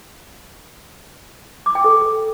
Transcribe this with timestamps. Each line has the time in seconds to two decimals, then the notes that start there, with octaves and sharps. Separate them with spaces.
1.66 D6
1.75 G5
1.84 A4